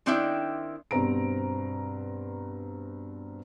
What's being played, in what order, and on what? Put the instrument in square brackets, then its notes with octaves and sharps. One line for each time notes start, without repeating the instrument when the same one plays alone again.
[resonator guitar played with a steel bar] D#3 C4 D4 E4 E5 G5
[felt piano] G2 B2 C4 C5 A#5 D7